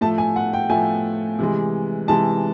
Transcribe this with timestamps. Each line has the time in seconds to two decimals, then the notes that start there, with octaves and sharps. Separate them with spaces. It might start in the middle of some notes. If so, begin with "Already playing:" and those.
0.01 A2 F3 A3 A5
0.18 G#5
0.36 F#5
0.53 G5
0.70 A2 F3 A3 G#5
1.39 C3 E3 G#3
2.08 C3 E3 G#3 A5